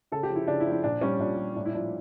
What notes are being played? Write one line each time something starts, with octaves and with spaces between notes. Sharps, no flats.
C#3 A4
G4
F3
E4
C#3 D4
E4
F3
E4
A#2 D4
G3 C#4
A#2 D4
G3
A2 D4
E4
F3 D4